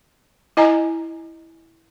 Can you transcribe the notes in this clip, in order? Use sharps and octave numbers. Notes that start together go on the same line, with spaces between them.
E4 D#5 G#5 A#5